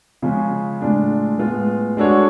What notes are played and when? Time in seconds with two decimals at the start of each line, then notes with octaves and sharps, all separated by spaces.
0.22 C#3 F3 G#3 C#4
0.81 A2 G#3 D4 F4
1.38 A2 G#3 B3 F4
1.97 G#3 D4 F#4 A4 C#5